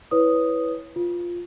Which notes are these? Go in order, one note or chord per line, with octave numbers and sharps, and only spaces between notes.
E4 B4 C#5 D#6
F4